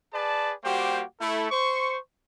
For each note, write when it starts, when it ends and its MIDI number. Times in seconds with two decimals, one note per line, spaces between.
0.14 0.54 68
0.14 0.54 71
0.14 0.54 74
0.14 0.54 81
0.64 1.03 55
0.64 1.03 58
0.64 1.03 66
0.64 1.03 67
0.64 1.03 72
0.64 1.03 79
1.20 1.50 57
1.20 1.50 64
1.20 1.50 69
1.50 1.97 72
1.50 1.97 85